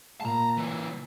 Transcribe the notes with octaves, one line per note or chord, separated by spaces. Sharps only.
A#2 A5 A#5
C#3 E3